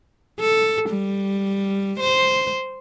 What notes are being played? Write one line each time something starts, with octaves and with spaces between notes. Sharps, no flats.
A4
G3
C5